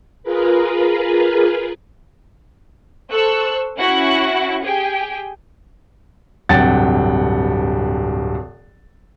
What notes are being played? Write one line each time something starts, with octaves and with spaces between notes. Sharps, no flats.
F4 G#4 A#4 B4
A4 C5 C#6 E6 F#6
C#4 E4 F#4 F#5 C#6
G4 G#4 G5 G#5
D1 G2 C3 F#5 G5 A6